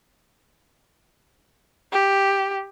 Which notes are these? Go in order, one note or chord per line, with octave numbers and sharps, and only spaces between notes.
G4